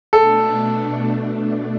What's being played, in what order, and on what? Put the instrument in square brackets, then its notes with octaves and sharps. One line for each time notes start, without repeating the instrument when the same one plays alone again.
[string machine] B2 A3 D4 [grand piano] A4
[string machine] B2 A3 D4